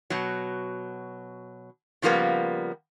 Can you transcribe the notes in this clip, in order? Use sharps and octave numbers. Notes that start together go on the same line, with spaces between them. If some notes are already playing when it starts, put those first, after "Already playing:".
B2 F#3
C#3 F3 G3 A#3 B3